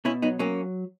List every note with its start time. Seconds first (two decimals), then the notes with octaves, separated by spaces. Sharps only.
0.05 B2 C#4 E4
0.22 F#3 B3 D#4
0.39 F#3 A#3 C#4